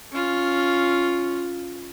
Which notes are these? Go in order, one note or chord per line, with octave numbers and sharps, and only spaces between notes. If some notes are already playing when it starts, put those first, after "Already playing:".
C#4 F4